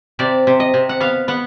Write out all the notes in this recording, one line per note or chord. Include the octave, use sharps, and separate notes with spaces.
C3 D5
C3
D#5
C3
F#5
B3 F5
B3 F#5